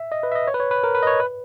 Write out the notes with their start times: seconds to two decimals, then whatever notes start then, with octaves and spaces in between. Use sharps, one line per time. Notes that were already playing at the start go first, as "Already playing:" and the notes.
Already playing: E5
0.12 D#5
0.23 B4
0.32 E5
0.35 D#5
0.47 C#5
0.54 B4
0.60 C#5
0.71 B4
0.83 A#4
0.95 B4
1.03 D#5
1.07 C#5
1.20 B4